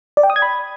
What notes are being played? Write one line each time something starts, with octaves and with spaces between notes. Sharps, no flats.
D5
G5
D#6
G#6
B5